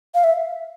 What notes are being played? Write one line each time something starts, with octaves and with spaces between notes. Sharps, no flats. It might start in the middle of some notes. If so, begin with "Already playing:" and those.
F5
E5